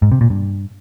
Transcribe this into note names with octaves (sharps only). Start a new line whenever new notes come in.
G#2
C3
A#2
G2